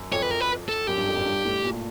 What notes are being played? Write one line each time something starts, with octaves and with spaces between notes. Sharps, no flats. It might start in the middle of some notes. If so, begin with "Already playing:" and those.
Already playing: F#2
F2 C#5
B4
A#4
B4
A4
F#2 G4
G2
F2
F#2
G2
A2
A#2